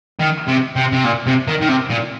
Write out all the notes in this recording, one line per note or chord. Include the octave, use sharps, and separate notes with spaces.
D#3
C3
C3
C3
A#2
C3
D#3
D#3
C3
A#2